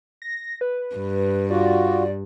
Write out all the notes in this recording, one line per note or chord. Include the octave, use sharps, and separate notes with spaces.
A#6
B4
G2
F4 F#4 D5